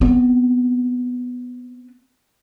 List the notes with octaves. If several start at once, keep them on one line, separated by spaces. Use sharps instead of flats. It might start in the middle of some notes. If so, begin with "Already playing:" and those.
B3 C4